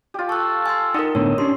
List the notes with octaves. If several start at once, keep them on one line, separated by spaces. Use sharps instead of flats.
F4 G4
A4 C#6 F#6
G#5 C6
D#4 A#4 D#5 F#5 E6
A2 D3 B3 C#5
C#4 D4 G4 C6